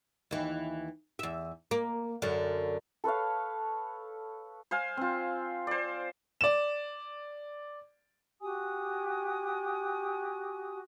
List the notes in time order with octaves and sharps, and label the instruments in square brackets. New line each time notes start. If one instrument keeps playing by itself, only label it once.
[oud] D#2 E3
E2 E5
A#3
F#2 D3
[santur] A4 B4 C#5 F5
[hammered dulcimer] C5 F5 G#5
C4 F4
C5 D5
[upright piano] D5 E7
[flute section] F#4 G4 G#5 D#6